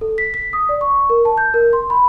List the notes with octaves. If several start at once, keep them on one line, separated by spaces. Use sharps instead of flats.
A4
B6
B6
D#6
D5
C#6
A#4
A5
G6
A#4
C6
B5